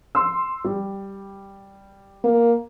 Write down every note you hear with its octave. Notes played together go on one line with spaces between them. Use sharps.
C6 E6
G3
A#3